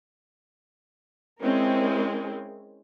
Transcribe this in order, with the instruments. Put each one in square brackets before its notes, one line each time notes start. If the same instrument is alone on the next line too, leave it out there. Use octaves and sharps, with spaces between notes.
[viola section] G#3 C4 C#4 E4 G#4 A#4